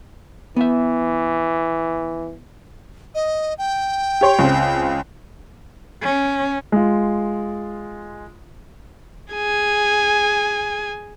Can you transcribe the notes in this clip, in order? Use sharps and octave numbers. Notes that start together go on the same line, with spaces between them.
E3 B3 E5
D#5
G5
G4 C#5 C6
C#2 C4
C#4
G#3 F4
G#4 G#5